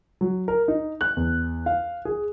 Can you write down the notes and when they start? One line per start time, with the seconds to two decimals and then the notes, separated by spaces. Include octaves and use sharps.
0.21 F#3
0.48 A#4
0.68 D#4
1.01 F#6
1.17 E2
1.66 F5
2.05 G#4